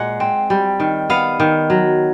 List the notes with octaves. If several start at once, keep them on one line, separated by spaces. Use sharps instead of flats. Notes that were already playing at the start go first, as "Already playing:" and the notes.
Already playing: A#2 G#3 F#5
C4
G3
D#3
B3 F5
D#3
F#3